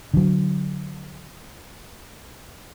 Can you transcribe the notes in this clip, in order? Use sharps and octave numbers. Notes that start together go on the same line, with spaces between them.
D3 F#3